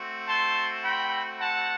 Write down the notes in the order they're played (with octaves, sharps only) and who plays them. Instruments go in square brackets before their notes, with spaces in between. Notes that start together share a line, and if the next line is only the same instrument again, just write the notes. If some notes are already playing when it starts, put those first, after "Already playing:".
Already playing: [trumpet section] A3 C4 F#4
A5 C6
G5 B5
F#5 A5